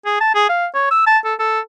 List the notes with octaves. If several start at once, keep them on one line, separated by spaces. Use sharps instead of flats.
G#4
A5
G#4
F5
C#5
E6
A5
A4
A4